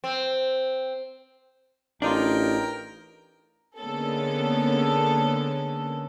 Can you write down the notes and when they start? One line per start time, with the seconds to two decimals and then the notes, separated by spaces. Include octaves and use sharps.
0.04 C4
2.02 A1 D4 D#4 F4 A#4 G5
3.78 D3 G#3 A#3 B3 C#4 A4